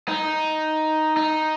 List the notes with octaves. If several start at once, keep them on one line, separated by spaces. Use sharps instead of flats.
D#4
D#4